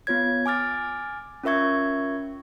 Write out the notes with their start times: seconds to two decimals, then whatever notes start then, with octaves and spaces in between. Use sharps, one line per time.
0.07 B3 F4 C#5 G#6
0.46 G#5 D6 F6 A6
1.43 C#4 F4 A#4 E5 C#6 G#6